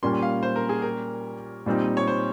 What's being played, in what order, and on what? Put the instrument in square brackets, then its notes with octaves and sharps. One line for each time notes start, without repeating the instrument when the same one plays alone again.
[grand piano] A#2 G3 A#3 C#4 [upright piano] C6
[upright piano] F5
C5
A#4
G#4
A#4
[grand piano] A#2 G3 C4 D#4
[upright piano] C#5
C5